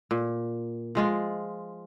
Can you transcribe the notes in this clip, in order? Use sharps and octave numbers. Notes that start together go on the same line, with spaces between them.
A#2
F3 G#3 F4